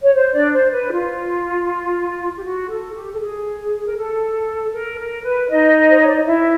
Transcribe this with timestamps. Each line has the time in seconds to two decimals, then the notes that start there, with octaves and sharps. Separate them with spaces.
0.02 C#5
0.14 C5
0.33 D4 D5
0.53 C5
0.72 B4
0.90 F4
2.37 G4
2.44 F#4
2.69 A4
2.95 G4
3.13 A4
3.20 G#4
3.86 A#4
3.97 A4
4.73 A#4
4.99 A#4
5.24 B4
5.49 D#4 D#5
5.90 C5
5.99 C#5
6.08 D5
6.17 D#5
6.25 E4 E5